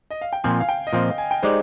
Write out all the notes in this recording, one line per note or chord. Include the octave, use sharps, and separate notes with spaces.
D#5
F5
G5
A#2 F3 C4 G#5
F5
G5
D#5
A#2 F3 C4 F5
G#5
G5
G#3 D#4 G4 C5 D5